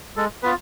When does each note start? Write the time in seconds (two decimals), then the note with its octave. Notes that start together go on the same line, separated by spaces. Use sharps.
0.17 G#3 A4
0.43 B3 F4 B4